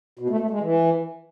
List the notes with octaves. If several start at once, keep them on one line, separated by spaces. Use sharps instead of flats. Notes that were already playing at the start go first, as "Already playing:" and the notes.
B2
A3
A3
G#3
E3